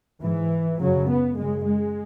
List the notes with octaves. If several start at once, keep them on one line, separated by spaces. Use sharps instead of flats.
G#2 E3
F#2 C#3 F#3
B3
F#2 C#3 G#3
G#3